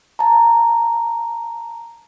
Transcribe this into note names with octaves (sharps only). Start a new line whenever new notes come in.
A5 A#5